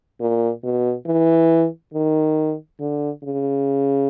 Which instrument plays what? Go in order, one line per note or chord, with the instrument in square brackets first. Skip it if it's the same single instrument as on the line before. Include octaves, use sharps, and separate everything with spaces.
[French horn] A#2
B2
E3
D#3
D3
C#3